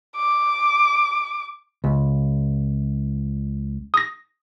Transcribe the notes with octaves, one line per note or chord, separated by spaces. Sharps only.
D6
C#2
D#6 A#6